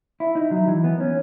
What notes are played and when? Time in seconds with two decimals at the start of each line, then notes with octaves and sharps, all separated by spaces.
0.20 E4
0.35 D#4
0.51 F#3
0.68 E3
0.84 B3
1.00 C#4